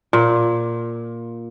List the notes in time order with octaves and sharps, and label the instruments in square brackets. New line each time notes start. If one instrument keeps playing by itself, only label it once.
[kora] A#2